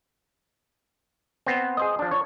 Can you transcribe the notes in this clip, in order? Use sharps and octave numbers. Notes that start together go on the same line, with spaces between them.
B3 C4
G#4 C5 D#5
F3 D4
C#5